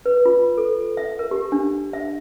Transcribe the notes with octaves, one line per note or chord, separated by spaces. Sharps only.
B4
F4
A4
E5
A#4
G4
D4
E5